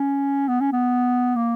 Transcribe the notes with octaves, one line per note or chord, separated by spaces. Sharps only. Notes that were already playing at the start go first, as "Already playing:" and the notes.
Already playing: C#4
B3
C#4
B3
A#3